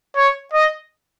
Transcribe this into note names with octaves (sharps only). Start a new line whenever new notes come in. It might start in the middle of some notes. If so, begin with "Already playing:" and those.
C#5
D#5